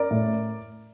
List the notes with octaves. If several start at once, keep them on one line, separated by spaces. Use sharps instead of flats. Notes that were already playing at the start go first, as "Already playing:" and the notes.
Already playing: A#4 D5
A2